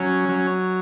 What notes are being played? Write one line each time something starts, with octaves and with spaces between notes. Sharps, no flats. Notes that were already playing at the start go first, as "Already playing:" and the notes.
Already playing: F#3 C#4
F#3